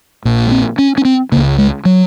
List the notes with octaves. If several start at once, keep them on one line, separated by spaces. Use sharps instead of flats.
A#1 A#2
A#3
C4
C#4
C#4
C4
C#2 C#3 A#3
G#3
F#3